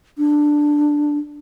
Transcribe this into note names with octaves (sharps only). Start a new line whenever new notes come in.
D4